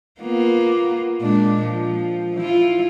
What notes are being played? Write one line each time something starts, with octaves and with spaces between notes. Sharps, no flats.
A#3 B3 F4
A#2 G#3 D4
F3
E4 F4